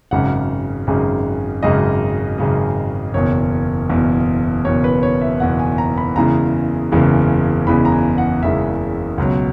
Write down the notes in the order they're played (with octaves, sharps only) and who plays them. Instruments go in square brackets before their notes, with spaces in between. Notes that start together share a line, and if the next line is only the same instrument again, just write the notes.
[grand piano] G#1 F#2 C#3 G#3 F#5
G#1 F#2 C#3 G#3
G#1 F#2 C#3 G#3 D#5
G#1 F#2 C#3 G#3
F#1 E2 B2 C#5
F#1 E2 B2
F#1 E2 B2 C#5
B4
C#5
E5
F#1 E2 B2 F#5
G#5
A#5
B5
F#1 E2 C#3 E3 G#3 A#5
F#1 E2 C#3 E3 G#3
F#1 E2 C#3 E3 G#3 B5
A#5
G#5
F#5
F#1 E2 C#3 E3 G#3 E5
C#2 B2 F#3